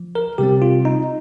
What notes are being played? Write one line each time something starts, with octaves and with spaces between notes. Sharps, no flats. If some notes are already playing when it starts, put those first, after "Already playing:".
Already playing: F3
A#4
C3 G3 C4 G4
F4
D#4